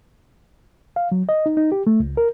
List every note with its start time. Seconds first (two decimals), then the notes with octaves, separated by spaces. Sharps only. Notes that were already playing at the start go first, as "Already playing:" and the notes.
0.96 F5
1.12 F#3
1.29 D#5
1.46 D#4
1.57 D#4
1.72 G4
1.87 A3
2.00 C#2
2.17 A#4